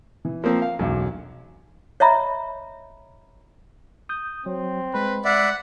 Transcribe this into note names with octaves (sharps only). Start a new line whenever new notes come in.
E3
F3 A#3 C4 A#4
F5
E1 B1 F#2
C#5 D#5 E5 A#5 B5
D#6 G6
F#3 C4
G#3 B4 B5
D5 E5 F#5